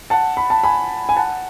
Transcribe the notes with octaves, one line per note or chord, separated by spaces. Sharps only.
F#5 A5
B5
A5
G#5 B5
G#5
F#5 A5